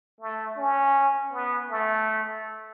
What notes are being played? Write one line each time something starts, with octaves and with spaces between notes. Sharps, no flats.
A3
C#4
B3
A3